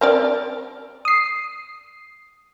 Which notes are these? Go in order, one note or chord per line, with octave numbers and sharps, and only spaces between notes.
C4 A#4 D5
D#6 C7